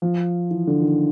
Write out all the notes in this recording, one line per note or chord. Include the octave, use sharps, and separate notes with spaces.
F3
E3
D3
D#3